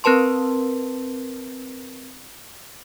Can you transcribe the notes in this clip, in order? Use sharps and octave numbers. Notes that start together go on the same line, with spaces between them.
C4 A#4 B4 A5 C6